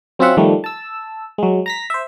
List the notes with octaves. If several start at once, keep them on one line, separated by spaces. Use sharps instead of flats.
F#3 C4 C#4 F4 E5 F#5
D#3 F3 G3 A3
A5 E6
F#3 G#3
A#5 A#6 B6
C5 E5